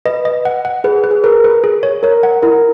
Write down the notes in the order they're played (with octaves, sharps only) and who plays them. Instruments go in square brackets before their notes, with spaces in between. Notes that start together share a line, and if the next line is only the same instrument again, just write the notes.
[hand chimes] B4 [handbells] D#5
[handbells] D#5
F#5
F#5
[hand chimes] G#4 [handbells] B4
[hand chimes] G#4
[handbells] B4
[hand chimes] G#4
[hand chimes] A#4 [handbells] B4
[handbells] B4
G#4
C#5
[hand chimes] A#4 [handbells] C#5
[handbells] F#5
[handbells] E4 [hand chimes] A#4